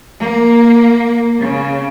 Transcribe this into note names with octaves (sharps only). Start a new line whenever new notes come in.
A#3
C#3